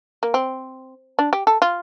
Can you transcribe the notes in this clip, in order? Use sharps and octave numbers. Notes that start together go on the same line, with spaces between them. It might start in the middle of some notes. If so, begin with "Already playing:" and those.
A#3
C4
D4
G4
A4
F4